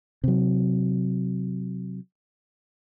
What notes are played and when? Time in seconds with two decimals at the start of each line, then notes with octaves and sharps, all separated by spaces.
0.24 C3 F#3